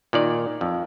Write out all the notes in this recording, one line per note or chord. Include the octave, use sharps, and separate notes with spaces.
A#2 D#3 D5
F2